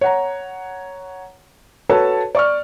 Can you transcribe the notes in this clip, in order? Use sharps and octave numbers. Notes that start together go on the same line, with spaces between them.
C#5 F#5 A#5
F#4 A4 B4 C#5 A5
D5 C#6 F6